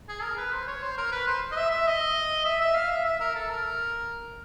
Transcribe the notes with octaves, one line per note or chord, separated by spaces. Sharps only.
G#4
A#4
B4
C5
C#5
C5
A#4
B4
C5
D#5
E5
E5
D#5
E5
E5
F5
E5
E5
A#4
A4
A#4